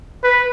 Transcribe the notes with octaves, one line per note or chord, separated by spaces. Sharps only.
B4